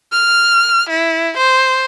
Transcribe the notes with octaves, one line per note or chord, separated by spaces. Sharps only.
F6
E4
C5